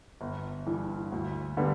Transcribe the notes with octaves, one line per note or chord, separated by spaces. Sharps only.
G1
G2 E3
D2
D3 G3 B3